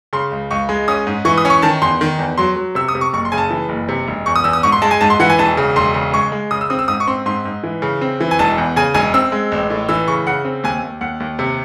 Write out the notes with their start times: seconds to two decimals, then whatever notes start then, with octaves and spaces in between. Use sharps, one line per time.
0.13 C#3 C6
0.31 C#2
0.51 C#2 C#6
0.69 G#3
0.88 C#4 D#6
1.07 G#2
1.25 E3 C#6
1.38 D#6
1.45 C#4
1.50 C#6
1.62 D#3 A5
1.82 E2 C6
2.01 D#3
2.19 E2
2.38 F#3 C6
2.56 F#3
2.75 C3 E6
2.89 D#6
2.95 C3
3.01 C#6
3.13 F#1 C#6
3.25 C6
3.32 C#3 G#5
3.38 A5
3.50 E3
3.69 F#1
3.89 C3
4.08 E1
4.26 E2 C#6
4.36 D#6
4.44 E2 E6
4.53 D#6
4.63 G#2 C#6
4.72 C6
4.82 G#3 A5
4.91 G#5
5.01 G#2 A5
5.10 C6
5.20 E3 F#5
5.30 G#5
5.38 E1 A5
5.57 C#3
5.76 E1 C6
5.94 C#3
6.13 G#3 C#6
6.32 G#3
6.51 C#3 D#6
6.61 E6
6.70 C4 D#6
6.79 E6
6.88 G#2 D#6
7.00 C#6
7.07 C4 C6
7.26 G#2 C6
7.45 G#2
7.64 E3
7.82 C#3
8.01 C4
8.20 E3
8.31 G#5
8.39 E1 A5
8.58 E2
8.76 C#3 G#5
8.94 E1 G#5
9.14 C4 E6
9.32 G#3
9.52 A1
9.70 A2
9.89 E3 E6
10.08 C#3 C#6
10.27 C#3 F#5
10.45 C4
10.64 D#2 G#5
10.83 D#2
11.01 D#2 F#5
11.20 D#2
11.39 C3